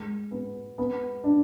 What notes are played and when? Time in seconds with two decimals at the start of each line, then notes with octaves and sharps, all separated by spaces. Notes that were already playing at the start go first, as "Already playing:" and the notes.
Already playing: G#3
0.31 B3
0.78 B3
1.24 D4